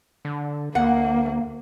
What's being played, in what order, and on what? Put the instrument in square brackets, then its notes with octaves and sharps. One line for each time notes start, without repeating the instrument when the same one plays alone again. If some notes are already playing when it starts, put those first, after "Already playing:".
[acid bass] D3
[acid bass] D2 [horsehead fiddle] A#3 [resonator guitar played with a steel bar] F#5